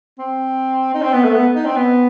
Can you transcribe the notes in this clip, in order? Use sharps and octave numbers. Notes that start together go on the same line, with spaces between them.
C4
D#4
C4
B3
A3
B3
D#4
C4
B3